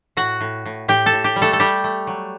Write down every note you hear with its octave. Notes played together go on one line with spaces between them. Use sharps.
A2 F#4 F#5
A2
A2
A2 G4 G5
A4 A5
A2
G4 G5
G3
A3 A4
A4
G3 A3 G4
A3
F#3